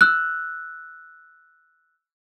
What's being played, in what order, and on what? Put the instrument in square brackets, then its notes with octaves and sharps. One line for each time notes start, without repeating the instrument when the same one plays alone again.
[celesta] E6 F#6